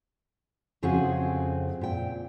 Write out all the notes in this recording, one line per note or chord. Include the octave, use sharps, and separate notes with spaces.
F2 C#3 C4 F#4 G#4
A#2 G5